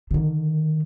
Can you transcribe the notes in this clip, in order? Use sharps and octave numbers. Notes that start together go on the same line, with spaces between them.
D3 D#3